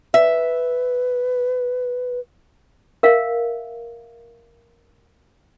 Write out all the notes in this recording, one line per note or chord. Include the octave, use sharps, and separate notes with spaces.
B4 E5
A#4 E5 F5